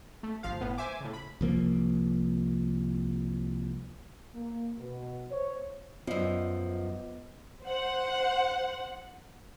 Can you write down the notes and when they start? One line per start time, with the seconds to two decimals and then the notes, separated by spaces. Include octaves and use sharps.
0.23 A3
0.43 G1 F3 F5
0.61 A2 B3
0.78 C5 E5 G#5 D6
1.00 A2 C#3
1.13 B5
1.41 C2 F3 A#3
4.35 A#3
4.79 B2
5.31 C5 C#5
6.07 F#2 F3 B3 D5 D#5
7.64 C5 F#5